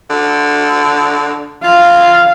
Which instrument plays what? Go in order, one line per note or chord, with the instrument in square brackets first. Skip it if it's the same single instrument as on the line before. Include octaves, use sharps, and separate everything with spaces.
[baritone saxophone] D3
[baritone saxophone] F4 [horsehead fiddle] F5